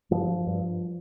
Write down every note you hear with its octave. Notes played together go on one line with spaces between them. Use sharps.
G2 F3
G2